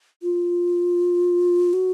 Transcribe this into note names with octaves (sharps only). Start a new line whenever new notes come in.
F4
F#4